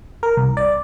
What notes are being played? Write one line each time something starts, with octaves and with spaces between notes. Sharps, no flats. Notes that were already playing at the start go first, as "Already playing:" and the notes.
A#4
C2
D5